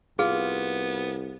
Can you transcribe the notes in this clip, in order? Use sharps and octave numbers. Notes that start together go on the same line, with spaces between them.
C2 B3 F4 G#4